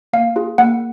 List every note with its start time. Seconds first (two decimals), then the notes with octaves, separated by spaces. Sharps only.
0.13 A#3 F5
0.36 F4 G#4
0.58 A#3 F#5